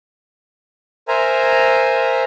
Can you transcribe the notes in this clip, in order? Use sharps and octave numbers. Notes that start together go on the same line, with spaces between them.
A#4 C5 E5 G#5 A#5